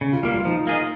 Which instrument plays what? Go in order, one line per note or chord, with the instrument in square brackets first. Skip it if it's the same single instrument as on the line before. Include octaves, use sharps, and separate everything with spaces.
[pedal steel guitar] C#3
[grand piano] F4
[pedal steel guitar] G3 A#3 [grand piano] F4
[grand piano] F4
[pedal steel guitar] F3 [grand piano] D#4
[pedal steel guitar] A#3 F4 G#4 D#5